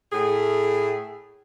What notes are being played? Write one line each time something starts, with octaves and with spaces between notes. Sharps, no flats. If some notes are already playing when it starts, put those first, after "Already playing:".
A2 G#4